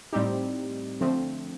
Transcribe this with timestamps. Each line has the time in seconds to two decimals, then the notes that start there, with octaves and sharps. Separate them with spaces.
0.12 A2 G3 C4 D#4 G4
1.00 D3 F3 A3 C4